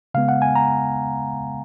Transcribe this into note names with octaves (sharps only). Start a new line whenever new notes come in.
C#3 G#3 B3 F5
F#5
G#5
A#5